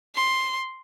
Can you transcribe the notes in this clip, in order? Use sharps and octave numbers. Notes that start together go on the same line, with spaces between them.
C6